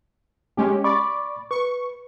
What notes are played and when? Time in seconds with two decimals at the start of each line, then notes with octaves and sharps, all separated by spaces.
0.57 G#3 C#4 G4
0.84 D5 B5 C#6 D6
1.51 B4 C#6